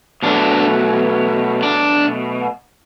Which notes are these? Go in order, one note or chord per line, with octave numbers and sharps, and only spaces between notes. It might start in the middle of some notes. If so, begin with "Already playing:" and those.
B2 F#3 A3 D4
D4